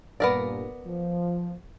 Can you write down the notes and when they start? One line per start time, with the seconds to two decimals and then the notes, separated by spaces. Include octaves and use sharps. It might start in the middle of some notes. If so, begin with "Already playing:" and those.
0.20 G2 A#2 B3 A#4 D5
0.86 F3